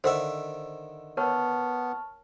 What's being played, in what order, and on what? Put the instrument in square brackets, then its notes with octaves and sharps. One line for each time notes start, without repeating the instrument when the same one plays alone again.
[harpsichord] D3 D#3 E5 [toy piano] C5
[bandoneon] B3 [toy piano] A#4 C#5 [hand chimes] A5 C#6 F6